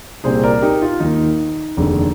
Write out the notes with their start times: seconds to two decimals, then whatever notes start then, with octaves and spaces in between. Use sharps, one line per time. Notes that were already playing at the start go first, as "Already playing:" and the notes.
0.24 C2 A#2 G3 C4 G#4 C5
0.43 A#4 D5
0.62 D#4 G4
0.82 F4
1.00 D#2 D#3 A#3 D#4
1.77 F1 D#2 D3 G#3